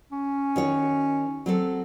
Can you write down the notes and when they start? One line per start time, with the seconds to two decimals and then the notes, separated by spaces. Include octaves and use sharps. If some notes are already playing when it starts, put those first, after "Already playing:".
0.12 C#4
0.56 D#3 F#4 C#5
1.46 F#3 C4 A4